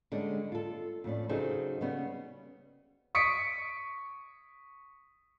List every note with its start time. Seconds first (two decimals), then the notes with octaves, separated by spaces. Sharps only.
0.12 D3 G3 G#3 C#4
0.52 F4 A4
1.04 F2 A2 C#4 D5
1.29 C#3 F#3 D#4 G#4 A4 C5
1.81 C#3 G3 B3 C#4
3.15 C#6 D#6 B6 C#7 D7